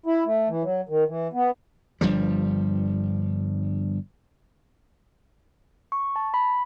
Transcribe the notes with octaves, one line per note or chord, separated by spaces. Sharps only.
E4
A3
E3
F#3
D#3
E3
B3
G1 G2 F3 G3
C#6
A5
B5